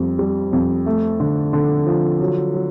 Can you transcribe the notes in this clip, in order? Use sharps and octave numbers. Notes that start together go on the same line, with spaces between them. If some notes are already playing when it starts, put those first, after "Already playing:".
Already playing: F2 G3
G3
F2
A3
D3
D3
F3
F#3
F#3